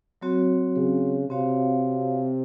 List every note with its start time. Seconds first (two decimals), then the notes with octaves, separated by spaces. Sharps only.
0.21 F#3 C4 F#4 C#5
0.76 C#3
1.29 C3 C4 F#4 C#5 F5